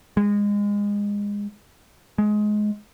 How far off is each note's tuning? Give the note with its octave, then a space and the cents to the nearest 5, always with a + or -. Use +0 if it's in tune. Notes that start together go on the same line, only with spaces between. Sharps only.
G#3 -25
G#3 +15